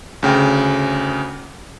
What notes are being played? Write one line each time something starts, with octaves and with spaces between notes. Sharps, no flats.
D2 C#3 G5